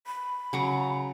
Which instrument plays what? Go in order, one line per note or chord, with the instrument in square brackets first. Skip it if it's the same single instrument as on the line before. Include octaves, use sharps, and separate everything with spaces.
[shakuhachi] B5
[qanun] C#3 F#3 A#5